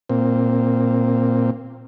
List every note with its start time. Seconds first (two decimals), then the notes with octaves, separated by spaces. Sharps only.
0.09 A#2 C4